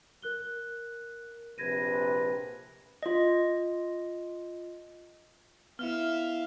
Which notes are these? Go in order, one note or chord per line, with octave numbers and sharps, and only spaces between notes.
A#4 F#6 G7
A#1 C3 B4 G#6 A#6 D#7
F4 D#5
B3 E4 E5 F5 F6